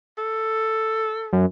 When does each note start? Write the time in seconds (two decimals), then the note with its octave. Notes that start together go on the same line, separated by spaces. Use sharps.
0.18 A4
1.33 F#2